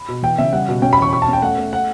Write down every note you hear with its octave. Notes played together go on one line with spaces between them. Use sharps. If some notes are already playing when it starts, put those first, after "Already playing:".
Already playing: B5
B2
E3 G5
C#3 E5
G3 F#5
B2
C#4 G5
B5
E2 C#6
B2 C#6
A5
C#4
G5
A3 F#5
A3
F#5